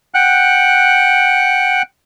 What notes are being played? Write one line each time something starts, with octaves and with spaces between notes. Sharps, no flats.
F#5 G5 F#6